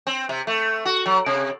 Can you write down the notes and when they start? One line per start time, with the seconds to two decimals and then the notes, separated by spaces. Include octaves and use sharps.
0.07 C4
0.29 C3
0.47 A3
0.85 F#4
1.06 F#3
1.26 C3